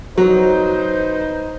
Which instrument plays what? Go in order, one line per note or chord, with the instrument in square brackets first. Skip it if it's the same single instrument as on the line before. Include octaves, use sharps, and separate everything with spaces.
[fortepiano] F#3 [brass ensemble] D#4 B4 C5